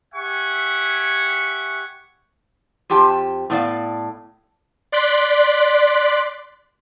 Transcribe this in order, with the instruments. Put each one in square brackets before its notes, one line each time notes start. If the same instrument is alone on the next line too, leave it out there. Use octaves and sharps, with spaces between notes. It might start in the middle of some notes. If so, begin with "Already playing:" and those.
[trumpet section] G4 E5 F#5 G#5 C#6
[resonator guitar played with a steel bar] F2 F4 G4 G5 A5
A2 B3 D5 F5
[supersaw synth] D5 C6 F#6 B6